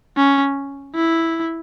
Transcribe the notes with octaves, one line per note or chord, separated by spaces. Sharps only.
C#4
E4